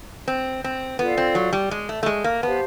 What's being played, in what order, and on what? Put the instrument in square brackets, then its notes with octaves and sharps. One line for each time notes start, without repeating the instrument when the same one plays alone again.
[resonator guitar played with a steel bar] C4
C4
[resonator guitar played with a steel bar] B3 [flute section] F4 A4 D5 F5
[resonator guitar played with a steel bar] C4
F#3
G3
G#3
A3
A3
G#3
A#3
[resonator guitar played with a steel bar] B3 [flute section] G4 C5 F5 A5